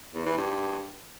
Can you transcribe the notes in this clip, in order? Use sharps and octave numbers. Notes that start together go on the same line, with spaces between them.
E2
E3
G2